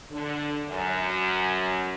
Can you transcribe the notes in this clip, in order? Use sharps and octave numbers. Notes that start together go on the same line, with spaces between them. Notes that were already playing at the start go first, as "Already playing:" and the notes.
D3
F#2